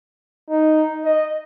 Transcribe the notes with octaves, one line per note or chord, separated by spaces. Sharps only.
D#4
D#5